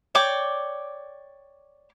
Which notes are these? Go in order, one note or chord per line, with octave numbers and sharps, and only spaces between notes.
C#5 D5 G5 D6